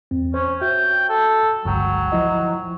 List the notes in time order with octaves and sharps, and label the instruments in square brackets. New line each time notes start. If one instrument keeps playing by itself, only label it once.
[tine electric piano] E2 C4
[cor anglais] C#4 [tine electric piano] C5
[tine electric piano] F#4 E5 [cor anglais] G5
[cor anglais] A4
[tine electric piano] G1 C#2 G5 [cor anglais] F#3
[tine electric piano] F3 E4 D#5